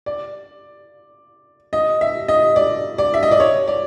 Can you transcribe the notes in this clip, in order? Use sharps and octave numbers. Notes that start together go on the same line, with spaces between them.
D5
D#5
E5
D#5
D5
D5
E5
D#5
D5
C#5
D5